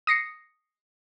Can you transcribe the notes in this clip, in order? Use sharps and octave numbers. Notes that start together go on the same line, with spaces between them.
D#6 A#6 C7 C#7